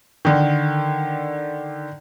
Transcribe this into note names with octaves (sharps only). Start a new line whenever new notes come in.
D3 D#3